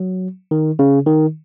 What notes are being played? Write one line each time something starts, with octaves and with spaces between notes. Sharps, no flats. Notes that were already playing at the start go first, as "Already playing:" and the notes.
Already playing: F#3
D#3
C#3
D#3